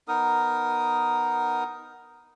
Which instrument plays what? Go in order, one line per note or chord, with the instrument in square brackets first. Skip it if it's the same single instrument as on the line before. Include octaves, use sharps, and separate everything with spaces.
[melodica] B3 D#4 A#4 D#6